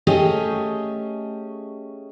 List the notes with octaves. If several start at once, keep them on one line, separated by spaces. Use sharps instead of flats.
A3 C#4 G4 G#4 D#5